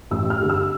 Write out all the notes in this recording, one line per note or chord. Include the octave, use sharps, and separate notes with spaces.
A1 E6
F6
G2 D3
E6